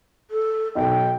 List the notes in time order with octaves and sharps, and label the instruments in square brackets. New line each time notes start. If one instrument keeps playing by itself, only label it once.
[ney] A4
[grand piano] B1 D#4 [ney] G5